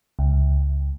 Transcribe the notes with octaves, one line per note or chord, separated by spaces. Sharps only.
C#2